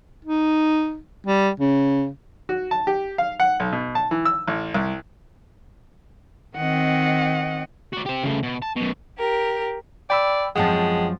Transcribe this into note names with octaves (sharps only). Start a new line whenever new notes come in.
D#4
G3
C#3
F#4
A5
G4
F5
F#5
B1
B2
A5
E3
E6
A1
C2
D#3 C4 D#5 F#5
F#4 D5
G4 C5
C#3 A3
B2
A5
F#2 B2
G4 A#4
D5 G5 B5 E6
F#2 F3 G#3 C4 F#5 G5 A5